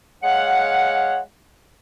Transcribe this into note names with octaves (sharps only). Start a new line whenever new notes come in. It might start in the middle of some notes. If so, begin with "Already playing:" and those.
G#3 C#5 F5 F#5